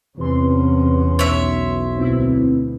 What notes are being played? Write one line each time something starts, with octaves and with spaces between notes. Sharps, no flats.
E2 C3 E3 C#4 C6
B1 C#5 E5
D2 B2 C4 E4